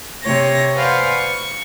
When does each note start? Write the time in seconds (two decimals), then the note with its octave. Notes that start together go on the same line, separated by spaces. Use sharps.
0.23 C3 C#5 A#6
0.75 B4 C5 D5 F5 F#5 G#5
1.13 C#6